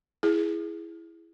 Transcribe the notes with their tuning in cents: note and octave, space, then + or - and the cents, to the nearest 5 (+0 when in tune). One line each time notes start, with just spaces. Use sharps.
E4 +5 G#4 +0